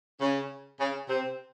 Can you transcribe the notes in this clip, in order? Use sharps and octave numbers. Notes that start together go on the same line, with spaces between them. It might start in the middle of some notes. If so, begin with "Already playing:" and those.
C#3 C#4
C#3 C#4
C3 C4